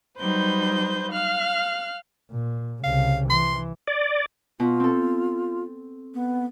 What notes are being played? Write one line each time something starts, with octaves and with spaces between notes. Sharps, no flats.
F#3 G3 D#4 B4 C5 G6
F5 F6 F#6
A#2
C2 C#3 F5
E3 C6
D5
B2 F4
C4 A4
B3